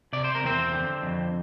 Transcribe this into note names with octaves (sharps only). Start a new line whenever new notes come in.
C3 D5
C5
A#4
E2 C4 C5
D3
F2